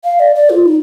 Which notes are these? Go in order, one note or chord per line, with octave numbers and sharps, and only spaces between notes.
F5
D5
D5
F4
D#4